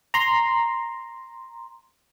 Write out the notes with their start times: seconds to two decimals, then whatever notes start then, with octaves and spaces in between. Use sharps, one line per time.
0.14 A#5 C6